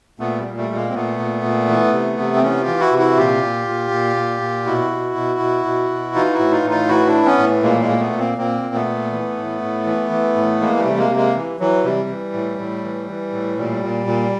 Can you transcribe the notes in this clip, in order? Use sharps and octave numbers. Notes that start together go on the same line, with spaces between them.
A#2 A3 B3
G3
A#2
G3 A3
A#2
G#3 A#3
C4
A#2 A3 B3
A#2
A#2
E3
C3
C3
C4
E3 B3 C#4
F4 G4
E3
E4 F#4
C3
E4 F#4
A#2 F4 G4
A#2
A#2
A#2
A#2
A#2
B2 E4 F#4
B2
B2
B2
B2
B2
E3 D#4 F4
E4 F#4
A2
D#4 F4
A2
D#4 F4
E3 E4 F#4
D4 E4
E3
B3 C#4
A2
A#2 G#3 A#3
G#3 A#3
A#2
A3 B3
A#2
A#3 C4
A#2 A#3 C4
A#2
A3 B3
A#2
E3
A2
A2
E3
E3
A2
E3 G#3 A#3
G3 A3
C3
G#3 A#3
C3
G#3 A#3
E3
E3 F#3
C3 G3
E3
A2
A2
E3
E3
A2
A#2 G3
A#2
A#2